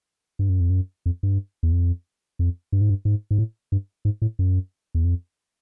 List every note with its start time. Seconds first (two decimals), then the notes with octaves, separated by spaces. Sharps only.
0.39 G2
0.49 F#2
0.60 F2
0.70 F#2
1.06 F2
1.23 G2
1.63 E2
1.72 F2
2.39 F2
2.72 G2
2.81 G#2
2.89 G2
3.05 G#2
3.31 G#2
3.38 A2
3.72 G2
4.05 G#2
4.22 A2
4.39 F#2
4.95 E2
5.04 F2